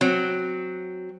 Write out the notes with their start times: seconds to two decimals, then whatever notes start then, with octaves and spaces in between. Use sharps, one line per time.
0.01 F#3 C4